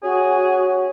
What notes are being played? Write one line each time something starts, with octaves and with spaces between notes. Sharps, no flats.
C#4 F#4 G#4